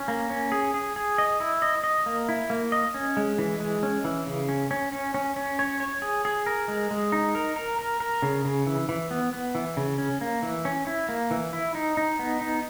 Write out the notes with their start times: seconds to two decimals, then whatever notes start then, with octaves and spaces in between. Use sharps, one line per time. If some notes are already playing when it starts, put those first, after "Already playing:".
Already playing: C#4
0.08 A#3
0.30 C#4
0.52 G#4
0.74 G#4
0.96 G#4
1.18 D#5
1.40 E4
1.62 D#5
1.84 D#5
2.06 A#3
2.29 E4
2.50 A#3
2.72 D#5
2.94 C#4
3.17 G#3
3.38 E3
3.60 G#3
3.83 C#4
4.04 E3
4.27 C#3
4.49 C#4
4.71 C#4
4.92 C#4
5.14 C#4
5.36 C#4
5.59 C#5
5.80 C#5
6.02 G#4
6.25 G#4
6.46 A#4
6.68 G#3
6.91 G#3
7.12 D#4
7.35 A#4
7.56 A#4
7.79 A#4
8.00 A#4
8.22 C#3
8.45 C#3
8.67 E3
8.89 E3
9.11 B3
9.33 B3
9.55 E3
9.77 C#3
9.98 C#4
10.21 A#3
10.43 E3
10.65 C#4
10.87 E4
11.09 A#3
11.31 E3
11.53 E4
11.75 D#4
11.97 D#4
12.19 B3
12.41 D#4